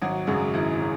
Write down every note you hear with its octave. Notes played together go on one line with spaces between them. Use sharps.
G#1 F#3 F#4
F#2 C#3 F#3 G#3 F#4
G#1 E4
E4
C#3